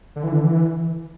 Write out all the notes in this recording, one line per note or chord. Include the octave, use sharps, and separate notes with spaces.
D3
E3
D3
E3